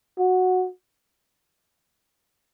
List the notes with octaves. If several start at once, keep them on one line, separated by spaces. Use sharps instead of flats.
F#4